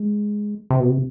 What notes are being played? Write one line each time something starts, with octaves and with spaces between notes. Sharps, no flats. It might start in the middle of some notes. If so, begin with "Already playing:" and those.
Already playing: G#3
C3
B2
C3